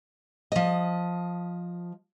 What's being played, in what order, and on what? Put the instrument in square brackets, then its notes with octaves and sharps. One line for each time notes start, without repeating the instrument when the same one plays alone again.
[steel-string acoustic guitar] F3 D#5